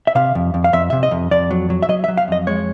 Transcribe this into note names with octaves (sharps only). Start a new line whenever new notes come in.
E5
C3 F5
F2
F2
F5
F2 E5
C3 E5
D#5
F2
F2 D5
F#3
F#3
E5
F#3 D#5
E5
F#3
F5
F2 D#5
G#3 C#5